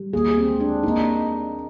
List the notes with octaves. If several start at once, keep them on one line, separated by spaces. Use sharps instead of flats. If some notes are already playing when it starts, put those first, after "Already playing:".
Already playing: G3
D#2 G#4
C4
G#3
D4
A#3 D#4